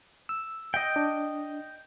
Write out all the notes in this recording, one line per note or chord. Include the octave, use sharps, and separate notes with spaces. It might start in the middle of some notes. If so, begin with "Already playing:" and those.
E6
D#5 G5
D4